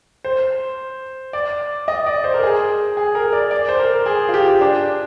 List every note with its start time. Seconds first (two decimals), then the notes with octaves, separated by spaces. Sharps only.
0.25 C5
1.33 D5
1.88 D#5
2.06 D5
2.24 C5
2.34 A#4
2.43 G#4
2.97 G#4
3.15 A#4
3.33 D5
3.51 D5
3.69 C5
3.79 A#4
4.06 G#4
4.29 F4
4.34 G4
4.61 D4